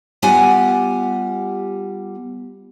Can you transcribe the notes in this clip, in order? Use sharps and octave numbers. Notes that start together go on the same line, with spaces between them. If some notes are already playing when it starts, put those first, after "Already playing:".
G3 B3 F4 G4 F#5 G#5